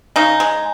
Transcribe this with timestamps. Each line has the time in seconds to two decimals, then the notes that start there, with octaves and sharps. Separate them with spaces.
0.16 C#3 D#4
0.40 G#3